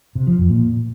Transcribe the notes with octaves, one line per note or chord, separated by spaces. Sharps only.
C3
F3
F2
A#2